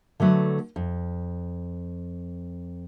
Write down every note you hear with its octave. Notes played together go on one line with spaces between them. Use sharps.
D3 F#3 A3 B4
F2